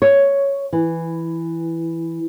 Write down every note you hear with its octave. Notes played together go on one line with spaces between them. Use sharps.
C#5
E3